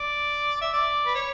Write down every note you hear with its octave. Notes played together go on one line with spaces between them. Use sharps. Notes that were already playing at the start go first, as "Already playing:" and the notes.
Already playing: D5
E5
D5
B4
C#5